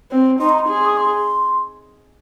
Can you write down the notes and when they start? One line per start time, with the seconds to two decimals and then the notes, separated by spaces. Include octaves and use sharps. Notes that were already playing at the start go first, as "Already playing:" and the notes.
0.11 C4
0.40 D#4 C6
0.49 A#5
0.59 C6
0.68 G#4
0.85 D#6
0.97 C6